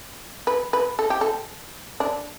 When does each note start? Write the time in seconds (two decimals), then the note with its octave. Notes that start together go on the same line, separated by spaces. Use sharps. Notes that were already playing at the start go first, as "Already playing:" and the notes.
0.47 B4
0.73 B4
0.99 A4
1.10 G4
1.21 A4
2.00 D4